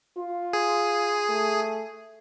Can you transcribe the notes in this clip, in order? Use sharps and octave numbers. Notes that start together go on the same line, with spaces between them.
F4
G#4
A3